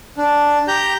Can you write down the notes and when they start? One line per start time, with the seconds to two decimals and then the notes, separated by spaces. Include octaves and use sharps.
0.18 D4
0.68 G4 A#5 G6